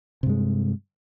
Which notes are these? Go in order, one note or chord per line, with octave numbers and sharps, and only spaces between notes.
G2 C3 G#3